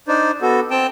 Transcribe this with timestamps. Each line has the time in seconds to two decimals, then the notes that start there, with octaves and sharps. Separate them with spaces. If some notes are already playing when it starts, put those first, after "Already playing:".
0.08 D4 D#4 C5 D5
0.42 B3 F#4 A4
0.71 C4 G5 A5